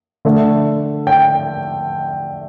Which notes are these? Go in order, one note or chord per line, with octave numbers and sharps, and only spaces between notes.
D3 A3
G5